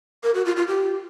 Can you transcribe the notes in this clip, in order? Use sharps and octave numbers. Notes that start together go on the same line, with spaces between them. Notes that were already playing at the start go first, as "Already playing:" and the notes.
A#4
F#4
F4
F4
G4